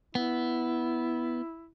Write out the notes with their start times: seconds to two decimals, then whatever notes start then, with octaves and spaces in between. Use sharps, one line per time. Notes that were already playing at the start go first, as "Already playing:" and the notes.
0.15 B3 E4